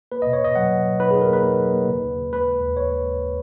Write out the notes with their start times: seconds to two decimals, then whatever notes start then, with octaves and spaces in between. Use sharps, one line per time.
0.12 A#3 B4
0.22 B2 D#5
0.33 C#5
0.41 B2 D#5
0.55 F#3 F#5
0.70 B2
0.86 F#3
1.00 D#4 B4
1.11 D#4 G#4
1.22 A#4
1.30 A#3 B4
1.44 A#3
1.59 F#3
1.74 A#3
1.89 C#3
2.03 D#2
2.18 C#3
2.33 G#3 B4
2.47 G#3
2.62 D#2
2.77 C#3 C#5
2.92 G#3
3.06 G#3